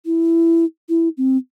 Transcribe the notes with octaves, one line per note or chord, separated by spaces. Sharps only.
E4
E4
C4